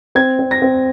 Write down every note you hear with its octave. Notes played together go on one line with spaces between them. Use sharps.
C4 G#6
C4
A#6
C4